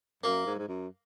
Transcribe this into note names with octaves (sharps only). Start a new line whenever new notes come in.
F#2 A#3
G#2
G#2
F#2